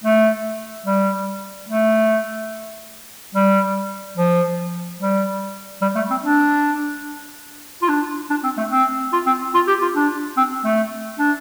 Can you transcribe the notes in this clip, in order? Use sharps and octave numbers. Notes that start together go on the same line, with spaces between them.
A3
G3
A3
G3
F3
G3
G3
A3
C4
D4
F4
D4
D4
C4
A3
C4
F4
C4
F4
G4
F4
D4
C4
A3
D4